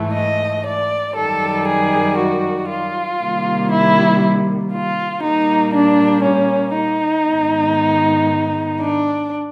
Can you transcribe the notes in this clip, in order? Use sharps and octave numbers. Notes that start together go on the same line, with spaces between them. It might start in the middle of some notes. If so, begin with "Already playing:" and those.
Already playing: G#2 E3 A3
D#5
D5
F#2 D#3 G3 A4
G#4
F#4
F4
C3 D#3 G3 A#3
E4
F4
A#2 G3 A#3 D#4
D4
C#4
D#4
G#2 D#3 G#3 B3
D4